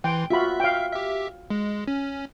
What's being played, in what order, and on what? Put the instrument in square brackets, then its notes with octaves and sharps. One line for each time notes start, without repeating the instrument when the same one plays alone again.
[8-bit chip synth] E3 C6 [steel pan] G5
[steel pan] F4 F#4 B5 [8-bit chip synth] E5
[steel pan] F5 G5
[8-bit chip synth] G4 E5
G#3
C#4